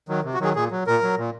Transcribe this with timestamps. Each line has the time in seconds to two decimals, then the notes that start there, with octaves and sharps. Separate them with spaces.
0.09 D#3 F#3
0.24 C3
0.34 F#4
0.40 D#3 F#3 G#4
0.55 A#2 G#4
0.71 F#3
0.87 A#2 A#4
1.03 F#3
1.18 A#2